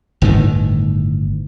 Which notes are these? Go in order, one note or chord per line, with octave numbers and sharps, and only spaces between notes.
G1 A2 D#3